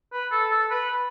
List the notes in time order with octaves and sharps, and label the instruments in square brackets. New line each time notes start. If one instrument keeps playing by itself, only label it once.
[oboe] B4
A4
A4
B4